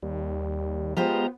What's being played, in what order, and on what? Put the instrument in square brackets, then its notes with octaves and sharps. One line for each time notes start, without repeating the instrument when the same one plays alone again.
[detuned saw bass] D#2 [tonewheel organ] G3
[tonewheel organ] G#3 A#5 [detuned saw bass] B3 [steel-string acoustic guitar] F4 G4 C5